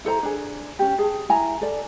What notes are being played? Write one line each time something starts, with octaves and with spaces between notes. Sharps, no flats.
E4 A4 C5 A#5
D4 G#4
C#4 G4
G#4 A5
E4 G#5 A#5
A4 D5